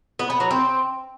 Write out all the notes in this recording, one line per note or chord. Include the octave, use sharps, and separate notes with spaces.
B3
B3
F#3
C4